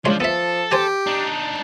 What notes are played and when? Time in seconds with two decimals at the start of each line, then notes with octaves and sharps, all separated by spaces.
0.05 C#2 F3 G#3 D4 C#5 C6
0.20 F3 B3 A4 E5
0.71 G4 C5 G#5 A5
1.07 D4 D#4